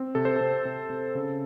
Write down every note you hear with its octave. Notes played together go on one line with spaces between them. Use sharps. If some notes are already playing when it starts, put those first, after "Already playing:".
Already playing: C4
C3 A4
C5
C3 A4
C3
C3
C#3